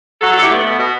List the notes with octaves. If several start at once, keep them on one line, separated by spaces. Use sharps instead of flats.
F#3 F#4 A4
F#4 A4
D3
E4 G4
A3 B3
B2 B3
B2